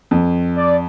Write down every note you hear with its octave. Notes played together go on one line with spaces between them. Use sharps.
F2
D5